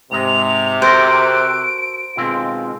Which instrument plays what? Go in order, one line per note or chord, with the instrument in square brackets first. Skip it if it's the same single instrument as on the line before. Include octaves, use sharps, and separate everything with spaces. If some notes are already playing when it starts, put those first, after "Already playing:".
[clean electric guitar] G#2 G#3 [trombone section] C3 [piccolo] F7
[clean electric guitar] F#4 A4 A#4 [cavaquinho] C5 [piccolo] D7
[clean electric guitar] B2 C4 [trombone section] D#3 G#3 F4